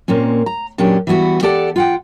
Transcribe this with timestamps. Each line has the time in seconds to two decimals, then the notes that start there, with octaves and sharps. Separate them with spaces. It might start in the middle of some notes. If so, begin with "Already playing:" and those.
0.08 A#2 A#3 C4 C#4
0.46 A#5
0.78 A#2 F#3 C#4 D4 G4
1.07 E3 G3 B3 F#4
1.43 G4 A4 D5 F#5 A5
1.76 F4 F#5 G5